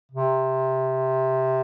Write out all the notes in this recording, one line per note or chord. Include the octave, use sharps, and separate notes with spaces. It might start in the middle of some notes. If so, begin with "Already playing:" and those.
C3